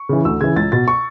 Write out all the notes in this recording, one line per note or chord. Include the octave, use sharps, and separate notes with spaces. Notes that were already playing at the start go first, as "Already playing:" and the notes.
Already playing: C#6
C#3 E3
D2 E6
C#3 E3 G#6
C#2 A6
B2 A6
C#6